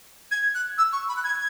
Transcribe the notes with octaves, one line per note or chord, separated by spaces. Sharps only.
G#6
F#6
E6
C#6
B5
F#6
G#6